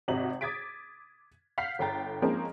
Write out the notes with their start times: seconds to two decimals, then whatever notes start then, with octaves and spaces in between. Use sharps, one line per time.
0.08 G#1 C3 F#4 D#5 E5 F#7
0.41 D6 D#6 G#6 A6 B6 D7
1.58 F5 F#5 F6 G6 B6 C7
1.79 G1 A4 G5 A#5 A6
2.22 F3 G#3 A#3 C4 C#4 D#4